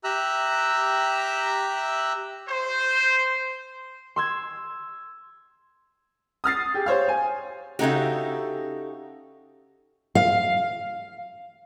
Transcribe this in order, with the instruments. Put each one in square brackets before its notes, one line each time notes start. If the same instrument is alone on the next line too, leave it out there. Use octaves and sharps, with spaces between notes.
[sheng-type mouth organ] G4 E5 A#5 E6 F#6
[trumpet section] C5
[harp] C6 E6 G#6
[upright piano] D#6 F6 A6 C7
G4 G#4
C5 C#5 F5
G#5
[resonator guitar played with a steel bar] C#3 D#4 F#4 [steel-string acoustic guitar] G4 A4 E5
[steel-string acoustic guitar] F5